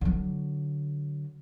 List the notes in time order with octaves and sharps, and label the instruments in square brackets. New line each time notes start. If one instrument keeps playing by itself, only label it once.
[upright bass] D3 F#3